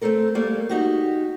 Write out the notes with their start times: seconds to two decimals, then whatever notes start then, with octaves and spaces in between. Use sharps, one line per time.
0.01 A3 A#3 C4 A4 A#4
0.35 G3 A3 A#3
0.69 D#4 F#4 G4